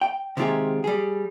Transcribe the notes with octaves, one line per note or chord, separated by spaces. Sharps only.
G5
C3 D#3 G#3 F4 G4 G#4
G3 G#4